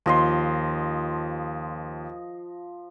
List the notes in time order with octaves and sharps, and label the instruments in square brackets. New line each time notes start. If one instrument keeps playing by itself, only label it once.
[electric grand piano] D#2 [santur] F3 D#5 C6